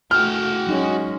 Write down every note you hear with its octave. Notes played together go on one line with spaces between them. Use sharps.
A3 F#4 G5 F6
F#3 G#3 C#4 D#4